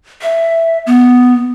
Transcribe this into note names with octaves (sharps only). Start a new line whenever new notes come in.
E5
B3